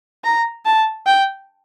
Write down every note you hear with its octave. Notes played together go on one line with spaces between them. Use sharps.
A#5
A5
G5